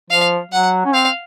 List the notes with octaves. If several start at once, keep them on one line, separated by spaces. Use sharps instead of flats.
F3 F5
F#3 F#5
C#4
C4 F5